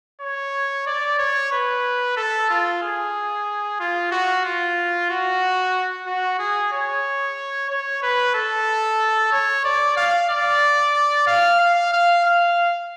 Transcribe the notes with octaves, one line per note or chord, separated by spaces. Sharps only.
C#5
D5
C#5
B4
A4
F4
G#4
F4
F#4
F4
F#4
F#4
G#4
C#5
C#5
B4
A4
C#5
D5
F5
D5
F5
F5
F5
F5